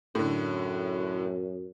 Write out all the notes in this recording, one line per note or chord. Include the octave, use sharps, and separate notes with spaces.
F#2 A2 D3